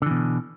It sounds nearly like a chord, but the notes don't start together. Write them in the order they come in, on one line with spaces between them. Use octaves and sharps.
D3 E3 B2